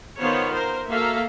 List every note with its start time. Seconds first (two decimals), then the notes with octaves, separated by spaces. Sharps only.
0.17 D#3 B3 F4 C5 C#5
0.51 A#4 C5
0.88 A#3 F#4 A4 E5 F5 A#5